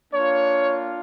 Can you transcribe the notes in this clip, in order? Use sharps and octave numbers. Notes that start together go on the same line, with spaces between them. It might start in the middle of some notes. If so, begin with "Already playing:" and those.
A#3 D4 F4 C#5